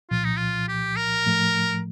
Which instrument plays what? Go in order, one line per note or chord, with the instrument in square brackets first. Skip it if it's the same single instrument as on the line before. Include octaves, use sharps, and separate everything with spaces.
[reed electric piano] C2 A#2 F3 [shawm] F4
[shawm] D#4
F4
G4
A#4
[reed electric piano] A2 F3 A3